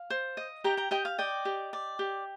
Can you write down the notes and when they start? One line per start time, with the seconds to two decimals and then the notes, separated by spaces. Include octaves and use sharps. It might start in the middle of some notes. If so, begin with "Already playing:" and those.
Already playing: F5
0.10 C5
0.37 D#5
0.64 G4 G5 A#5
0.77 G5 A#5
0.91 G4 D#5 G5
1.05 F5
1.18 D5 D#5 G5
1.45 G4
1.73 D5
1.99 G4